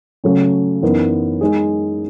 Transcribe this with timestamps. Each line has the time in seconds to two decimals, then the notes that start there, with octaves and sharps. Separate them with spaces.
0.24 C#3 F#3 A3 C#4
0.82 F#2 E3 B3 D#4
1.41 G#3 D#4 G#4